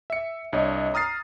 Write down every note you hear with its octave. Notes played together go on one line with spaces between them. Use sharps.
E5 C#7
C2 D4 C#5 D#5
A#5 D#6 F6 A6 C7